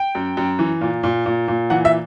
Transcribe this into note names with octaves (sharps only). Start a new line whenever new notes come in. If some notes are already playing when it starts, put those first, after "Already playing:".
Already playing: G5
F#2
F#2
E3
A#2
A#2
A#2
A#2
E3 F#5
E5